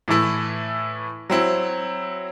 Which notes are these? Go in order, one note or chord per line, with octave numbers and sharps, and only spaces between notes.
A2 E3 A3 E4
F#3 C4 E4